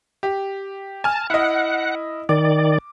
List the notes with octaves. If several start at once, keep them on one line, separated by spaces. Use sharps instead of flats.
G4
G#5 A5 F6
E4 D#5 F#5
D#3 D5 D6